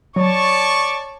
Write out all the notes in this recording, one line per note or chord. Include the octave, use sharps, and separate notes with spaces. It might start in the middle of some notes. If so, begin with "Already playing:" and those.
F#3 C#5 D5 A5 C#6